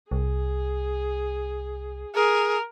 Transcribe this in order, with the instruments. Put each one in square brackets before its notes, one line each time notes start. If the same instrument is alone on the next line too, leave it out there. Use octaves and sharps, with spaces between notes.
[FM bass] C2 [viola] G#4
[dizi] G#4 [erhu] A#4